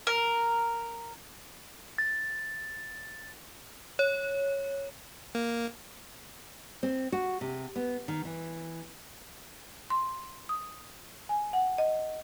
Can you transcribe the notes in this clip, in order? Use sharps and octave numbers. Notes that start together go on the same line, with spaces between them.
A#4
A6
C#5
A#3
C4
F#4
C3
B3
D#3
E3
C6
D#6
G#5
F#5
D#5